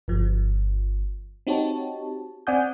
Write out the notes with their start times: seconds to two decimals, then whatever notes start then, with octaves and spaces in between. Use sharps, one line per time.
0.08 G1 F3
1.47 C4 D#4 F#4 G4 C#5 A5
2.47 C4 D5 F#5 G#5 D#6 G6